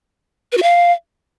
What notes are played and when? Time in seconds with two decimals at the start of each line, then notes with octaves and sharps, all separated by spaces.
0.52 B4
0.57 F#4
0.62 F5